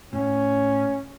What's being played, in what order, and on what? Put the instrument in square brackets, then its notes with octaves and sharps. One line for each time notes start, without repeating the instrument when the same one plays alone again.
[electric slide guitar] A2 [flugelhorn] C#4